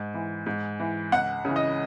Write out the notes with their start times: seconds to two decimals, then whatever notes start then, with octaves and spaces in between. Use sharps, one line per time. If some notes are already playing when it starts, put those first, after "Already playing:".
Already playing: G#2
0.14 E3
0.46 G#2
0.80 E3
1.12 C#2 F#5
1.45 C#3 E3
1.56 D#5